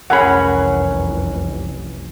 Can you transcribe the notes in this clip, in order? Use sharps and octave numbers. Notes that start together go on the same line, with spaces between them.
F1 C2 E3 C#4 G#4 A#4 F#5 B5